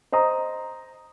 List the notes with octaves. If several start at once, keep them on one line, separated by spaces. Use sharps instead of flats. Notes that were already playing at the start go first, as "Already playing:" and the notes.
C5 D#5 A#5 D#6